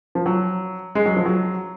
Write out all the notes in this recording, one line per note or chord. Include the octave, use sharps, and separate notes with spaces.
F3
F#3
G#3
F#3
F3
F#3